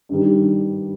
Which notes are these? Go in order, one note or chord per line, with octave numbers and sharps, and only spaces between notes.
G2 D#3 G3